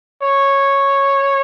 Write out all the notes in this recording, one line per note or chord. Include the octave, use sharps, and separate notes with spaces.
C#5